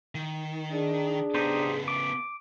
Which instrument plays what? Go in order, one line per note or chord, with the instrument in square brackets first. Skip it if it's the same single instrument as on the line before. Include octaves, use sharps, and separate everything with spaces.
[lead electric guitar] D#3
[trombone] D4 [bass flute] G#4
[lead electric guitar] C#3 B3 [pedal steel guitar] D#4 G4 C5
[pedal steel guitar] D6